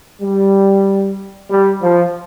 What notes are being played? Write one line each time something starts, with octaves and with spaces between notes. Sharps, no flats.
G3
G3
F3